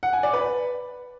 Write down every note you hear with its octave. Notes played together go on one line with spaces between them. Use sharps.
F#5
G#5
D5
B4